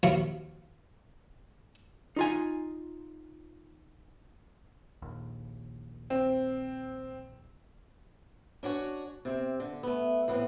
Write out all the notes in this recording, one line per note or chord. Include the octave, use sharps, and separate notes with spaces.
D#2 F3 F#3 E4 F5 C#6
D#4 F4 G#5
A#1 D#2
C4
C#4 D4 F#4 C#5
C3 C4
D3
A3 B3
A2 E3 B3 C4